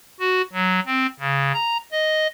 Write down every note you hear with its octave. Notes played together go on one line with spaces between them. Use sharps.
F#4
F#3
C4
C#3
A#5
D#5